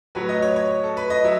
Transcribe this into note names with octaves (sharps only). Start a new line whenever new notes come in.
A2 F#3 B4
D#5
C#5
C#5
A4
B4
D#5
F#3 E5